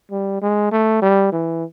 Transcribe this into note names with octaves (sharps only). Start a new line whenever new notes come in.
G3
G#3
A3
G3
E3